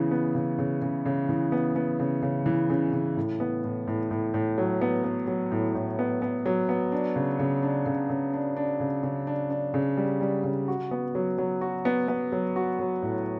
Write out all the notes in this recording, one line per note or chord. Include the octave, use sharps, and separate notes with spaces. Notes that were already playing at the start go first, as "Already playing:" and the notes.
Already playing: C#3 E3 B3
B3
C#3
C#3
C#3
C#3
E3
B3
B3
C#3
C#3
E3
C#3
C#3
A2
B3
A2
A2
A2
A2
F#3
B3
B3
F#3
A2
A2
B3
B3
F#3
B3
D4
C#3
C#3
D4
C#3
C#3
D4
D4
C#3
C#3
D4
D4
C#3
G3
G3
C#3
F#4
B3
F#3
F#3
F#4
B3
B3
F#3
F#4
F#3
A2